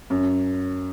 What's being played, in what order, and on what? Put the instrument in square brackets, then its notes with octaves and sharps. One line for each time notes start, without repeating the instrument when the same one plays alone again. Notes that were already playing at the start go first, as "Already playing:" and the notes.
[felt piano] F#2